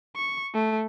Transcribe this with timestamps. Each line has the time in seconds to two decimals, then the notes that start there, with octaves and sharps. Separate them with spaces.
0.16 C#6
0.54 A3